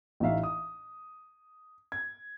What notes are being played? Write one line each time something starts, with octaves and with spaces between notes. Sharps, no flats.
A1 E3 D#4 E5 F5
D#6
G#6